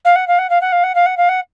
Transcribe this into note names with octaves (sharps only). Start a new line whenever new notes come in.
F5
F#5
F5
F#5
F5
F#5
F5
F#5
F5
F#5
F5
F#5